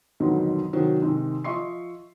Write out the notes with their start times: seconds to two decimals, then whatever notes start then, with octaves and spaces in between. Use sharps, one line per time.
0.20 F2 G#2 B2 D3 D#3 F#3
0.73 C3 D#3 F#3 F#4 C5
1.01 G#2 C3 D#3
1.44 F3 D#5 E5 C6 C#6 C7